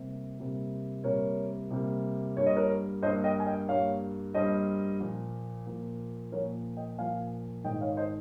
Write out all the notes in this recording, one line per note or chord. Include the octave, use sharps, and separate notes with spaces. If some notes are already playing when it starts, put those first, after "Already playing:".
Already playing: C3 G3 A#3
C3 G3 A#3
C3 G3 A#3 A#4 C#5
C3 G3 A#3
G2 G3 A#3 C#5
D#5
A#4 C#5
G2 G3 A#3 C5 D#5
D#5 G5
G#5
D#5 G5
G2 G3 A#3 C#5 F5
G2 G3 A#3 C5 D#5
A#2 F3 A#3
A#2 F3 A#3
A#2 F3 A#3 A#4 C#5
D#5 G5
A#2 F3 A#3 F5 G#5
G#2 D#3 G#3 D#5 G5
C#5 F5
C5 D#5